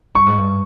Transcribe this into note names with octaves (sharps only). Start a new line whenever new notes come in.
G2 C#6
G#2
G2